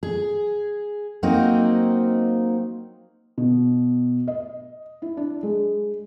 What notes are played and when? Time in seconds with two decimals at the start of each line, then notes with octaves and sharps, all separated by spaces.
0.03 G#4
1.23 F#3 A#3 C4 D#4
3.38 B2
4.28 D#5
5.02 E4
5.17 D4
5.43 G#3